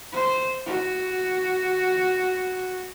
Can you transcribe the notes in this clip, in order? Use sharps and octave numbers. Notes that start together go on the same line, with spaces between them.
C5
F#4